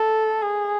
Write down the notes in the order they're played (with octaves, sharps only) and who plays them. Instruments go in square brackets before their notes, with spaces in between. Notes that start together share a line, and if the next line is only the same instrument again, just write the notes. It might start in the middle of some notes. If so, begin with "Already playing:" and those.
Already playing: [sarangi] A4
G#4